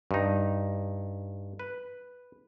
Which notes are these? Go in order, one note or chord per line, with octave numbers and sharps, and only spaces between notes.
G2 D#4
B4